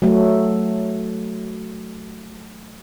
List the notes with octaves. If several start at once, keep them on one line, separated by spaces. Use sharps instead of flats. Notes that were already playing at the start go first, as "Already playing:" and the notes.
F#3 A3